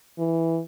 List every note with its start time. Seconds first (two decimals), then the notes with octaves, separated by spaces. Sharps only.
0.18 E3